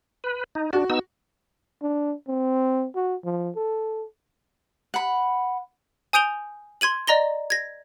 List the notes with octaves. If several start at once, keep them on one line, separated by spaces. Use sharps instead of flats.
B4
D#4
D4 F#4
B3 D#4 E6
D4
C4
F#4
F3
A4
F#5 B5
G#5 D#6 G6 D7 F7 G7
C6 G#6 D#7 F#7
D5 D#5 A#5 A#6 G7
G#6 A#6